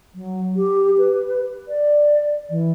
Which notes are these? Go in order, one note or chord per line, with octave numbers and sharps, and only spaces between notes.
F#3
G4
B4
D5
E3